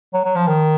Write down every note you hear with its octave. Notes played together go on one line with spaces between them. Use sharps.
F#3
F#3
F3
D#3